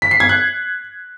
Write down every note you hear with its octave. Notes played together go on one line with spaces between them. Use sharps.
B6
C7
G#6
F#6